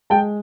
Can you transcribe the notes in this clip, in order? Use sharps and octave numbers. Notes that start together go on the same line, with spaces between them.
G#3 G5 A5